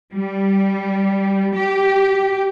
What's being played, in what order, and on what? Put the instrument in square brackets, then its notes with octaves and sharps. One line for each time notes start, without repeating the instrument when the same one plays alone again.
[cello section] G3
G4